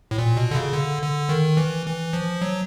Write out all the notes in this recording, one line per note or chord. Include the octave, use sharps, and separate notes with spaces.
A2
A#2
B2
D3
C#3
D3
D3
D#3
E3
E3
F3
F#3